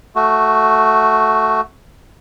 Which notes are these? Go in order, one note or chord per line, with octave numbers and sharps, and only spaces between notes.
A3 F#4